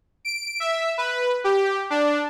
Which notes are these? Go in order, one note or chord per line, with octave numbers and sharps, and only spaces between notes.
D7
E5
B4
G4
D4